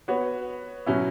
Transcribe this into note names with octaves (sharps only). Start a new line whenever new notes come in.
B3 F#4 C#5
B2 F#3 C#4 E4